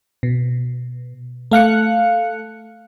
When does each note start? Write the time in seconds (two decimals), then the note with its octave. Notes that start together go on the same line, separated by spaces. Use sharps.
0.23 B2
1.51 A3 F5 F#6 C#7